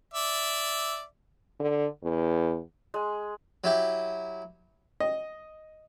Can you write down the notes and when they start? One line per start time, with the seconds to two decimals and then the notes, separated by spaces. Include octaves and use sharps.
0.14 D5 E5
1.60 D3
2.03 E2
2.94 G#3
3.64 F#3 E4 G4
5.00 D#5